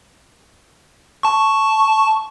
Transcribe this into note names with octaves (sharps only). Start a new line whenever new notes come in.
A5 C#6